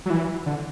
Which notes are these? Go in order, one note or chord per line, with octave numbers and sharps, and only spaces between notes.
F#3
E3
D3